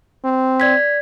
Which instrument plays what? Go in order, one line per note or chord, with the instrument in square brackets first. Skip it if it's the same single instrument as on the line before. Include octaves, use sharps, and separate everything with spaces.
[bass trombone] C4
[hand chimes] D5 G#6 B6